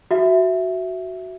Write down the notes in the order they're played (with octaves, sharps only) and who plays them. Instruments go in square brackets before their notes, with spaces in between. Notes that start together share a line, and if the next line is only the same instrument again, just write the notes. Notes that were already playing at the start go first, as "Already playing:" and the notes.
[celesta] F#4 E5